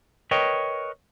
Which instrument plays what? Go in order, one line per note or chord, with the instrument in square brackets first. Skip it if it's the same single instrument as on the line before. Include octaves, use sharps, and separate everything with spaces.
[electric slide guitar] A#4 B4 C#5 D#5 G5